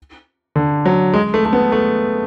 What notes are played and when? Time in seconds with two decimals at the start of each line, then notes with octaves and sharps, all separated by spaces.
0.56 D3
0.86 F#3
1.14 G#3
1.34 A3
1.45 A3
1.53 B3
1.72 A3